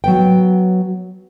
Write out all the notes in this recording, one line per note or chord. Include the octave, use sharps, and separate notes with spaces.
F#3 B3 G5